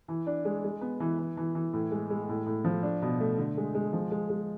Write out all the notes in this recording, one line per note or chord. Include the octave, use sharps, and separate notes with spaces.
E3
D4
G#3
G#3
B3
E3
E3
E3
E3
A2
G#3
G#3
A2
A2
F3
D4
B2
A3
D3
G#3
G#3
F3
G#3
G#3